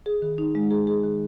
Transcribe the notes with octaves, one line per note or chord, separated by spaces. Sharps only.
G#4
D#3
D#4
G#3
G#4
G#4
D#3